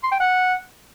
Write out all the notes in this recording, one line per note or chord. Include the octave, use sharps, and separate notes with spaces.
C6
G5
F#5